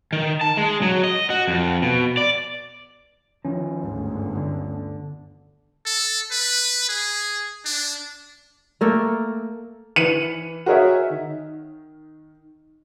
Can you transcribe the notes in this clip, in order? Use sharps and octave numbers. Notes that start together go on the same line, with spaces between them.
D#3
A5
G#3
F#3
D#5
F#4
F2
B2
D5
D#3 F3 C#4
G1 D2 G#2
D3
A4
B4
G#4
D4
A3 A#3 A4 G5
E3 C#7 D#7 F#7
F#4 G#4 A#4 C#5 D#5 E5
D#3